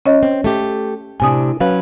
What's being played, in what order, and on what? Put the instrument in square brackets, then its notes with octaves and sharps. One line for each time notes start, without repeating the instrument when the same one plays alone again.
[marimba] C#4 C#5 D#5
[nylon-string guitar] C4
A3 G4
[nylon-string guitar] A2 C3 D4 [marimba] G#5 D#6
[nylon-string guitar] F#3 C#4 B4 [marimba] F5